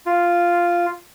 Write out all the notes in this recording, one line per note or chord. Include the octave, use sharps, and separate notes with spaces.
F4